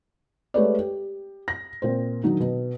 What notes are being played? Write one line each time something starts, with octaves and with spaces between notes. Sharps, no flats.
G#3 A3 G4 B4 C#5 D5
G4
A#6
A#2 C4 C5
D#3 F#3 D4 D#4
B2